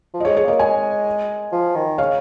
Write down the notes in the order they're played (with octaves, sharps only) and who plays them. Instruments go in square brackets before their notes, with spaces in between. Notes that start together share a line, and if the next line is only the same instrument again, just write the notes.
[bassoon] F3
[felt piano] D#5
G#4 C#5
[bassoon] G#3
[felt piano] G#4 C#5
[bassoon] A#3 [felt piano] A#4 D#5
[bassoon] G#3 [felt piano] D#5 G#5
[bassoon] F3
D#3
[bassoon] C#3 [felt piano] C#5 F5